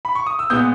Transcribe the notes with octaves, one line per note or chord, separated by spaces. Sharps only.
B5
C#6
D#6
E6
A#2 G#3 B3 D#6 G6